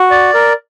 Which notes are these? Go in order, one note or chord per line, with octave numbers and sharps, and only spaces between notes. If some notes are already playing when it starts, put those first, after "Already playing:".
Already playing: F#4
D5
A#4